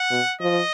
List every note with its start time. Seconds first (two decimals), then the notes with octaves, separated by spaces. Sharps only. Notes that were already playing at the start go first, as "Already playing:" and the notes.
Already playing: F#5
0.10 B2
0.41 F3 D#5